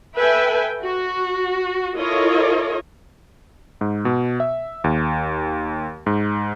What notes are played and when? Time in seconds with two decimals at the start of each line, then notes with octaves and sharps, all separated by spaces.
0.17 A4 B4 E5 G5 G#5
0.81 F#4
1.97 E4 F4 A4 A#4 C#5 D#5
3.81 G#2
4.05 B2
4.40 E5
4.84 D#2
6.06 G#2